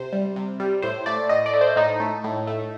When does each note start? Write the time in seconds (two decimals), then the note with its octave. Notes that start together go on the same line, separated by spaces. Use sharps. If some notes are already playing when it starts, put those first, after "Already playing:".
Already playing: C3 C5
0.13 G3
0.36 C3
0.60 G3
0.82 A2 C5
1.06 A3 D5
1.29 A2 D#5
1.46 D5
1.54 A3
1.61 C5
1.76 A2 D#4
2.00 A3
2.24 A2
2.47 A3